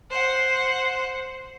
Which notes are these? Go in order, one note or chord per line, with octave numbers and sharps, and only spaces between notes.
C5 F#5